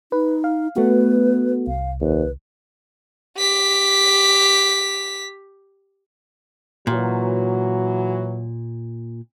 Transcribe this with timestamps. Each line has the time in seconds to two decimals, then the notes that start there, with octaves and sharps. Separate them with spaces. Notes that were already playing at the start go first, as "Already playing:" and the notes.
0.12 D#4 B4
0.44 F5
0.76 A3 B3 F#4 B4
1.67 C2 F5
2.01 D#2 B4
3.38 G4 B6
6.87 A#2 E3 F#3